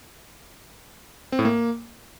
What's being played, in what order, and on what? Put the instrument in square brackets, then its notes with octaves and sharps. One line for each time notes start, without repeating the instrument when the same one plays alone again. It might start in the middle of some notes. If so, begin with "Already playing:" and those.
[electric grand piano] C4
A2
A#3